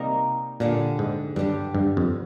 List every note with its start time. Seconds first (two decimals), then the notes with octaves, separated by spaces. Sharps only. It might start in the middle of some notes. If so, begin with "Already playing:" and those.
Already playing: C3 G3 A#3 D#4 A#4
0.60 A#2 D3 G3 D4 G#4
0.99 G#2
1.36 G2 G3 D4 G4
1.75 G2
1.97 F2